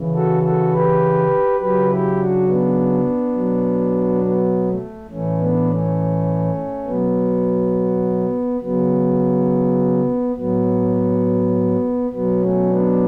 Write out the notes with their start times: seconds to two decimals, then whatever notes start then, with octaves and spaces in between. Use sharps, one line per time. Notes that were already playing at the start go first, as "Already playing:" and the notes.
Already playing: C#3 E3
0.14 F#4 A4
0.43 F#4 A4
0.73 G4 B4
1.60 C#3 F#3 G4 B4
1.90 E4 G4
2.19 D4 F#4
2.47 B3 D4
3.35 F#3
3.40 B2
4.23 B3
4.67 A3
5.10 A2 E3 A3 C#4
5.39 B3 D4
5.69 A3 C#4
6.86 B2 F#3 B3
8.61 C#3 F#3 B3
10.36 A2 F#3 B3
12.11 B2 F#3 B3
12.40 A3 C#4
12.69 B3 D4